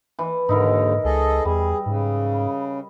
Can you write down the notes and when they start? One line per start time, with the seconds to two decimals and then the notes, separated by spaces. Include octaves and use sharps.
0.19 E3
0.49 D#2 G#2 D3 D#4 E4 A#4
1.04 C#2 G#4 A4 D#5
1.45 E2 G3 G#4
1.86 G#2 C#3